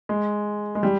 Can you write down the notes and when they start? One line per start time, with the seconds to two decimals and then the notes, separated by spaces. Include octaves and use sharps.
0.09 G#3
0.75 G#3
0.83 G3